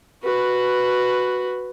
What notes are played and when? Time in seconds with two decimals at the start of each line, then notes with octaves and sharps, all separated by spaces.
0.23 F#4 B4